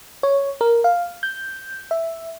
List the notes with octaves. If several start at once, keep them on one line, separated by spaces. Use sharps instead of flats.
C#5
A#4
F5
G6
E5